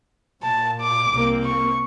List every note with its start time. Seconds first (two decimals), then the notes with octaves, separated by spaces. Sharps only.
0.43 A#2 A5
0.80 D6
1.13 C2 A#3 C4
1.44 C#6